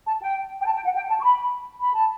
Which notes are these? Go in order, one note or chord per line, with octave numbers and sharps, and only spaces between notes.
A5
G5
G5
A5
G5
F#5
G5
A5
C#6
B5
B5
A5